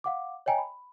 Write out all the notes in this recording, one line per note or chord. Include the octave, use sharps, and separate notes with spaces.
F5 F#5 D6
C#5 D#5 G5 G#5 A#5
B5